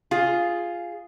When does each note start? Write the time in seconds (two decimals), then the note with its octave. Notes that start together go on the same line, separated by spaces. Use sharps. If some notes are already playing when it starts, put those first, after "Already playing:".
0.11 F4 G#4